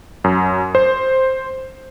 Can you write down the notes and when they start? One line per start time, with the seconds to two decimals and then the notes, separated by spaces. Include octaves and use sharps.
0.24 F#2
0.75 C5